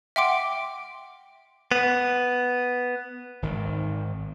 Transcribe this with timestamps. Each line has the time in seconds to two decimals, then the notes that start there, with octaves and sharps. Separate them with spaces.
0.16 E5 F#5 G5 C6 D6 D7
1.72 B3
3.42 G#1 D#3